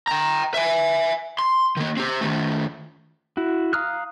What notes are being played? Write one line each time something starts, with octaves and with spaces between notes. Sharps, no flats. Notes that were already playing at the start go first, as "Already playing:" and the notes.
G5 A#5
E5 G#5
C6
D#3 A#3
C4 G4
D#3 A3
E4 F#4
F5 A#5 D#6 F6 F#6